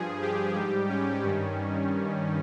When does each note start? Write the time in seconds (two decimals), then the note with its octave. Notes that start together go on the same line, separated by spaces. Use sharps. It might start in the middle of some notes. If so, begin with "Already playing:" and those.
Already playing: G2 F3 G#4
0.22 G4
0.55 G#2 G3
0.89 C#4
1.23 G2 D#3 G3